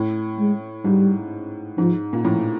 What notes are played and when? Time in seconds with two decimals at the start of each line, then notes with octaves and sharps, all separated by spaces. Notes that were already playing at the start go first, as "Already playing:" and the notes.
Already playing: A2
0.38 G#3
0.84 G#2 G3
1.78 G#2 F3
2.13 A#2
2.24 A2 F3